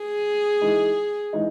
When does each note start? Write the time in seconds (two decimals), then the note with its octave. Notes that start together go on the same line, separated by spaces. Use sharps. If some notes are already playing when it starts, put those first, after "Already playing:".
Already playing: G#4
0.61 E3 G#3 D#4
1.33 E3 G#3 D#4